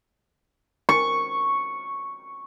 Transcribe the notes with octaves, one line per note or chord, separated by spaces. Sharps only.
C#6